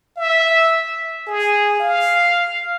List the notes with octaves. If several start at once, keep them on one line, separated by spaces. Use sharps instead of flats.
E5
G#4
F5